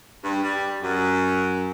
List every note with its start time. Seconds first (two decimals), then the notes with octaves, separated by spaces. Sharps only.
0.24 G2
0.44 G3
0.83 F#2